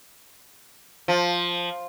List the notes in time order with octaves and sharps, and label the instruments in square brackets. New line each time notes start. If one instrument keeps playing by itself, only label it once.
[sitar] F3